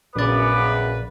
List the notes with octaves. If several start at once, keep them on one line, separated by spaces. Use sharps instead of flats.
A#1 F#2 C#3 B3 B4 D5 D6